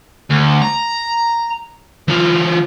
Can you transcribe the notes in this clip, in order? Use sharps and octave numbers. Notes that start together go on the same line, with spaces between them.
D2
A#5
E3 F4